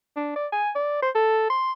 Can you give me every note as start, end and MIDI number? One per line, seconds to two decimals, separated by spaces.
0.16 0.32 62
0.36 0.47 74
0.52 0.70 80
0.75 1.00 74
1.02 1.10 72
1.15 1.47 69
1.50 1.72 84